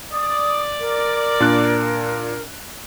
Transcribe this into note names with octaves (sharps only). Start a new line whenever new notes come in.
D5 D#6
A#4
A#2 D4 F#6